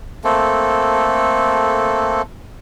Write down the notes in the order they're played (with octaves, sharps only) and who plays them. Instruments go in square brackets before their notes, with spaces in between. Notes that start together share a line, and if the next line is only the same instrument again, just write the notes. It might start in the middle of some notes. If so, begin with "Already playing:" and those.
[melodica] A3 A#3 C4 A4